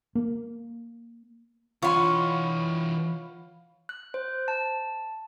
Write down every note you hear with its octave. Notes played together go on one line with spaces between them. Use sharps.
A#3
E3 F4 C#5 D#5 F#5 B5 C6
F#6
C5
A5